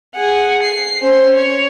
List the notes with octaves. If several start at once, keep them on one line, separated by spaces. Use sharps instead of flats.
G#4 F#5
C7
C#4 C5
C#5